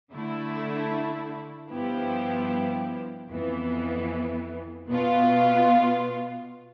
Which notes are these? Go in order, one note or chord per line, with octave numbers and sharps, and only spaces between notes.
D3 A3 E4
G2 F3 B3 E4 G4
F2 E3 B3
B2 B3 F4